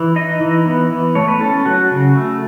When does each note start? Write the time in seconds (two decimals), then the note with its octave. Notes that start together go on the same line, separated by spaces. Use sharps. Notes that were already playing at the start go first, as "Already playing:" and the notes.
Already playing: E3
0.16 D#4 D#5
0.41 E3
0.66 B3
0.90 E3
1.15 A3 C#5
1.28 B4
1.41 C#4 A4
1.65 F#3 F#4
1.91 C#3
2.15 A3